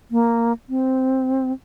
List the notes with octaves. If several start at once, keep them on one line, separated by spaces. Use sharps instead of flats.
A#3
C4